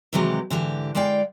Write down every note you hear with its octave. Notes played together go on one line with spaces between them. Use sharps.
C3 D#3 E3 F#3 G#3 G4
G#2 D3 E3 G4
G#3 E4 D5 F5 G5